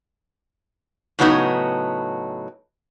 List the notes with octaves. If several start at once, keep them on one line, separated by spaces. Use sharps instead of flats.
A2 C#3 F#3 B3 D#4